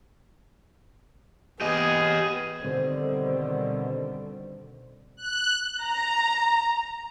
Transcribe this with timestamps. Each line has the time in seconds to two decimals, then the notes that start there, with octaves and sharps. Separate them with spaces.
1.61 B3 G4 G#4 D#5
2.63 B2 D3 D#3 G3 C4
5.16 F#6
5.83 A#5